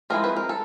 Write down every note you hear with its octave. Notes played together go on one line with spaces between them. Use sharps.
F3 G#3 C4 E4 A#4
B4
A#4
A4